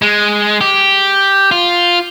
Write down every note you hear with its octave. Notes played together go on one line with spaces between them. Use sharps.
G#3
G4
F4